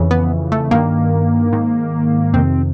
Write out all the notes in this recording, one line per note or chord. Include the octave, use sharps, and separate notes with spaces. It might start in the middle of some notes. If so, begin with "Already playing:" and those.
Already playing: F2 C#3 E3
B3
A3
G2 D#3 A#3
G#2 D#3
F2 C3 D#3 C4